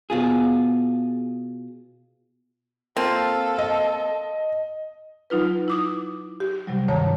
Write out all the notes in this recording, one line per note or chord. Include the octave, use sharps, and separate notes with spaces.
B2 F4 G#4
A#3 C4 F4 A4
D#5
F#3 D#4 F4 B4
E4 D6 D#6
G4
C3 F#3 G3
D2 G2 D#3 C#5 A5 A#5